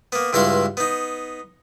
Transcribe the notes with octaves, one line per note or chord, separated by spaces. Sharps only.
A#3 B3
C#2 G2 E4 F#4 F5 C6
B3 D#4